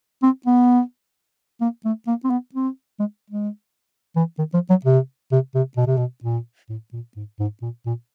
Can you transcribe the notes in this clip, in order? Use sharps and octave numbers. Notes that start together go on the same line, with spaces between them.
C4
B3
A#3
A3
A#3
C4
B3
C4
G#3
G#3
E3
D#3
F3
F#3
C3
C3
C3
B2
C3
B2
A#2
A2
A#2
G#2
G#2
A#2
A#2